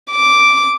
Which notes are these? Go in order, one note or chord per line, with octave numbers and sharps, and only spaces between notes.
D6